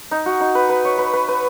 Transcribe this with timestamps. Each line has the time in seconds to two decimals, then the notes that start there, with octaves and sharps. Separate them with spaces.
0.11 D#4
0.26 F#4
0.40 D#4
0.55 B4
0.69 B4
0.85 C#5
0.98 B4
1.13 B4
1.28 B4